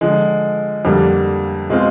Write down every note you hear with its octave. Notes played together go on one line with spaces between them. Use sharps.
D3 F3 G#3
F2 D3 G3 A#3 D4
B2 G#3 C4 F4